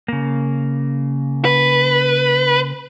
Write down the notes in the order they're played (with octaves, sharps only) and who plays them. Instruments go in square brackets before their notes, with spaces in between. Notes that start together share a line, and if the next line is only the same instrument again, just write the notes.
[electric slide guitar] C#3 A#3
[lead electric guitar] B4